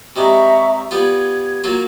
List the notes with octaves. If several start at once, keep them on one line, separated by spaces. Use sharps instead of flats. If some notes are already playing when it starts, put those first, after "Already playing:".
C3 G3 G#3 E5 A#5 C#6
G3 B3 F4 G#6
F#3 A#3 F4